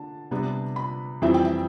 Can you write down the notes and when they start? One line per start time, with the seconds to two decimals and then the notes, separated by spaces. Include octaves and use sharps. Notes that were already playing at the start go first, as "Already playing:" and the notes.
Already playing: D3 D4 A5
0.31 C3 G3 B3 D4
0.76 B5
1.22 F2 E3 G3 C4 E4 E5
1.34 G5
1.45 E5